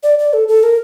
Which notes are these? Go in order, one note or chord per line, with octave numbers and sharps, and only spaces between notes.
D5
D5
A4
A4
A#4